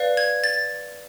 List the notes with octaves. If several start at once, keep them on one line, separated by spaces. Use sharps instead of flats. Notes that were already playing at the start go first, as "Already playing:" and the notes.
Already playing: B4 D5 F5
G#6
A6